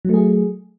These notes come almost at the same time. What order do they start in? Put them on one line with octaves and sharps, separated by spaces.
F#3 A3 G#4